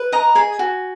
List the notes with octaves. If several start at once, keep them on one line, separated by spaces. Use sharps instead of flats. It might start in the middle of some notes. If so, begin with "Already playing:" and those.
Already playing: B4
D#5 A#5
G#4 G#5
F#4